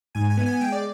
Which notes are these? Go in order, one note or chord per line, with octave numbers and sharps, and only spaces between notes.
G#2 G#5
G#5
B3
G#5
G#3 G5
D5